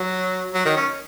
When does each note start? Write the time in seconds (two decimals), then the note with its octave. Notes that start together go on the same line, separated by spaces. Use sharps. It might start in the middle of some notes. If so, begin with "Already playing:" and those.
Already playing: F#3
0.54 F#3
0.65 D#3
0.76 C#4